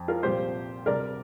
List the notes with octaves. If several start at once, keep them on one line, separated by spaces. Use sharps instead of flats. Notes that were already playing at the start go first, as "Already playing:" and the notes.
Already playing: F2
F4 A#4
C2 A#2 F3 C4 G4 C5
D2 C3 G3 A#4 D5